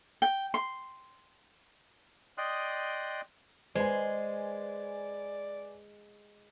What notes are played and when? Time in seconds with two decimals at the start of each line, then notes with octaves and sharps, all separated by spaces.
0.22 G5
0.54 C6
2.38 D5 D#5 G5 C6 D#6 F#6
3.75 G#3 B4 C5 D5 G#5